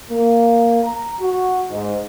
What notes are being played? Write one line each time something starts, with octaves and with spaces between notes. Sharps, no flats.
A#3
A#5
F#4
G#2